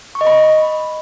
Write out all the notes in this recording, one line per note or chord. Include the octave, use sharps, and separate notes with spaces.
C#6
D#5
B5